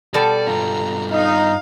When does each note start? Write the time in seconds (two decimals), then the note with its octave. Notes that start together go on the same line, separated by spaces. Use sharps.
0.14 B2 G3 A4 D5
0.48 G2 F4 A#5
1.12 D#4 F5